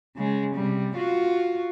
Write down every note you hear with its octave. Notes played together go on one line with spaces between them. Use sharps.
C#3 G#3
C3 G3
F4 F#4